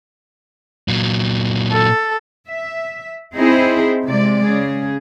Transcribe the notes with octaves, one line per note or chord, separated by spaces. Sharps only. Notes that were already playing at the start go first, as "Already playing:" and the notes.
A#2 F#3
A4
E5
C4 D#4 E4 G#4 C5
C3 G#3 D5
C#3 G#4